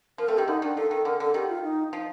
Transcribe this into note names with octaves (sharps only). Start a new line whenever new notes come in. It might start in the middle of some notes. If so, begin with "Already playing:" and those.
F3 A#4
A3 C4 A4
D#3 G4
D3 D#4
D#3 D4
F3 A4
D#3 A4
D3 A#4
D3 A4
D#3 G4
F4
D#4
F3 D#4